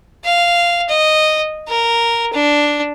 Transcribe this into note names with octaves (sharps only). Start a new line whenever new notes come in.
F5
D#5
A#4
D4